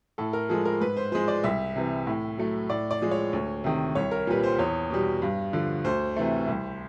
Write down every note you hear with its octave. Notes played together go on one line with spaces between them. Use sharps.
A2 A4
A#4
F3 G#3 A4
A#4
G#2 B4
C5
F3 G#3 C5
D5
C2 E5
C3 E3
A2
F#3 A3
A2 D5
D5
F3 G#3
C#5
D2
C3 D#3
C2 C#5
A#4
A#2 G3 B4
C5
E2 C#5
B2 G3
G2
D3 F3
D2 C5
C3 E3 A3
C2